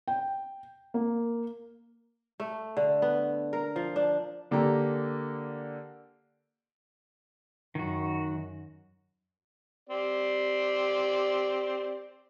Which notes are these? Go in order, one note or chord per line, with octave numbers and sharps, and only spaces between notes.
G5
A#3
A3
D3
B3
A#4
F3
D4
D3 A#3 G4 A4 A#5
F#2 D#3 F#4
C4 G4 D5